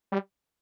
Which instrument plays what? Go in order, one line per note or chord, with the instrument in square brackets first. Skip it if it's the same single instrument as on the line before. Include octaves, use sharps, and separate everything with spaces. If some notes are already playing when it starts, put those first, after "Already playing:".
[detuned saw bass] G3